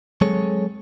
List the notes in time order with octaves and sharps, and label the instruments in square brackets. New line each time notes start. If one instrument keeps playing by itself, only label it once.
[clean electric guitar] F#3 G#3 C4 G#4 A4 C#5